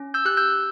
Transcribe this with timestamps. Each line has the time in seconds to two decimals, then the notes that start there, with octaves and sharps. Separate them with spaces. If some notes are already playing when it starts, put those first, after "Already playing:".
Already playing: C#4
0.14 E6 G6
0.25 G4 F#6
0.37 E6 G6